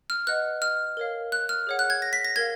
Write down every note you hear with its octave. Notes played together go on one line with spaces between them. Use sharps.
F6
B4 D#5 F#5 F#6
F6
A#4 C#5 F5
F#6
F6
G#4 C#5 F#5
F#6
G#6
A#6
B6
A#6
A#4 F5 G#6